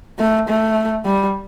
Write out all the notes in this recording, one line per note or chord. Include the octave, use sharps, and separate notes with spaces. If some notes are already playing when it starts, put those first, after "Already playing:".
A3
A3
G3